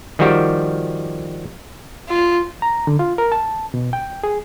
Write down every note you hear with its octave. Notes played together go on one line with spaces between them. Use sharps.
D#3 F3 G3 F#4 G4
F4
A#5
D3
F4
A#4
A5
B2
G5
G#4